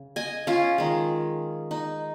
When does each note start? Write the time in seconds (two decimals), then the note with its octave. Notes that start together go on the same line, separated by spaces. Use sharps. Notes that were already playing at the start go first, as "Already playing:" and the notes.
Already playing: C#3
0.16 D#5 G#5
0.47 C#4 F4
0.78 D#3 G#3
1.71 D#4